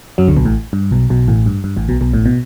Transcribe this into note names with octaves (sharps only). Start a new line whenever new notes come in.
F#2 F#3
D2 D3
B1 B2
A1 A2
G2
B1 B2
B1 B2
A1 A2
G2
G2
A1 A2
B1 B2
B1 B2
A1 A2
B2